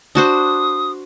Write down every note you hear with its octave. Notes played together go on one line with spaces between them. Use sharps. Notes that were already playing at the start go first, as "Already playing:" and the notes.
D4 F#4 C5 D#6